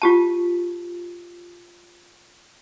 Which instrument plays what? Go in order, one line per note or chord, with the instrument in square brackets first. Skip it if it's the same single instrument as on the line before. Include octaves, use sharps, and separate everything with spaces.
[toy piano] F4 G4 A5